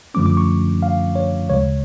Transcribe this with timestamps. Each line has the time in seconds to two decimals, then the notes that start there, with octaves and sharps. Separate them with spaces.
0.14 F#2 D3 F3 A3 C#4 D6
0.26 D6
0.37 C#6
0.83 F5
1.16 C#5
1.50 D2 C#3 G#3 C#5